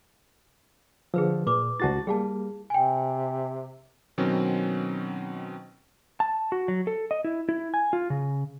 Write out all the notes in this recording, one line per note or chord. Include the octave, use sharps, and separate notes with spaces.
D3 F3 G#4 B4 E6
A#2 B4 D6
C#2 E4 F#4 G4 A5 A6
G3 A#3 G#4 F5 A5
C3 G5 G#5
B2 D#3 F#3 C4 C#4
A5
F#4
F#3
A4
D#5
E4
E4
G#5
F4
C#3